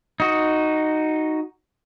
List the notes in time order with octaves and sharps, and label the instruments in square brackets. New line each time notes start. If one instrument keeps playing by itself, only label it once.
[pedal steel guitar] D#4 F#4